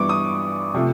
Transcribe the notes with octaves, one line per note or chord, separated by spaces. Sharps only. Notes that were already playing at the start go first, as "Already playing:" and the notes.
Already playing: G2 E3 G3 B3 C#6 D6
D#6
C3 F3 A3